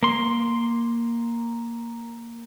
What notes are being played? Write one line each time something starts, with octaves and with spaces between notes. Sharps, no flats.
A#3 C6